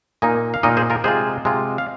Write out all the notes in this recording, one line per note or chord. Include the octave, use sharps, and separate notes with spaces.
A#2 A#3 D#4 D#5 G#5
F5
A#2 A#3 D#4 A#4 D#5
G#4 C5
F4 A#4
C3 G#3 F4 G#4 C5
C3 G#3 F4
F5